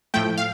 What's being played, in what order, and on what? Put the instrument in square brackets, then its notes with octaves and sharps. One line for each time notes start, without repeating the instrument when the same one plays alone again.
[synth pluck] A2 F3 A3 G5
F5